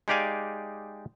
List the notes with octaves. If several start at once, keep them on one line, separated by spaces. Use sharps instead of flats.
G#3 D#4 G4 D5 F5 G#5